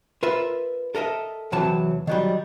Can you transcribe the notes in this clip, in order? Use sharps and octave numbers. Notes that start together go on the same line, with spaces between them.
F4 A#4 B4 E5
A4 A#4 D#5 E5
E2 C3 E3 F#3 A5
D#3 F#3 G3